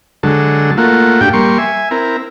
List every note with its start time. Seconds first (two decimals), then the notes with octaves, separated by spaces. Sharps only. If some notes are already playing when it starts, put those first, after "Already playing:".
0.23 D3 F#3 G#3 A4
0.78 A3 A#3 F4 F#4
1.21 A2 D4 G4 G5
1.33 G3 A#3 C6 C#6
1.58 E5 G#5
1.91 C4 E4 A#4